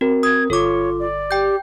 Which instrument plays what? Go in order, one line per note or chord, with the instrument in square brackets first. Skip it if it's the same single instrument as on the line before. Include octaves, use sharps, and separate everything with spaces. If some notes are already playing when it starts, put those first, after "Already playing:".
[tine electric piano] C4 A#4 [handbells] F#4
[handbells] D#6 [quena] G#6
[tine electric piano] G1 [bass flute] F4 [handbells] A4 D6 [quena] C#5
[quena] D5
[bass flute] G4 [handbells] G5 G6